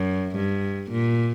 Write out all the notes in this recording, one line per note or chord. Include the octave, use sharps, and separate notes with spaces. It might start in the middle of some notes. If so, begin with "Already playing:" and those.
Already playing: F#2
G2
A#2